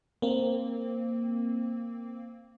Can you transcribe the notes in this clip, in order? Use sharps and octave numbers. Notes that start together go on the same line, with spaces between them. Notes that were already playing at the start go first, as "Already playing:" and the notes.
A#3 C4